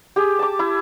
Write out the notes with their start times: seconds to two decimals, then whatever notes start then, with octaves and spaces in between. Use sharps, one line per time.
0.16 G4 G#4
0.39 A5 D6
0.59 E4